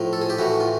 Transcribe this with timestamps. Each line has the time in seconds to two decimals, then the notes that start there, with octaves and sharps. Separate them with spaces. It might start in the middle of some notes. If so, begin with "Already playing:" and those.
Already playing: A2 F3 A3
0.13 A4
0.21 G#4
0.30 G4
0.38 A2 E3 A3 F#4
0.60 F4